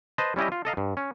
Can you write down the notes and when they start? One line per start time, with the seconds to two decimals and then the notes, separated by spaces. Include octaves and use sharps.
0.18 B4 C5 D#5 A5
0.36 G3 C#4 E4 G4 D#5
0.52 F4
0.65 A4 D#5 F5 A#5
0.77 G2
0.97 C#4